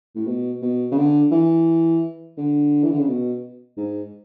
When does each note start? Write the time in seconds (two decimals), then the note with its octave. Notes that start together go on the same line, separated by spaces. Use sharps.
0.15 A2
0.27 B2
0.62 B2
0.92 C#3
0.97 D3
1.31 E3
2.37 D3
2.84 E3
2.91 D3
3.00 C#3
3.08 B2
3.77 G#2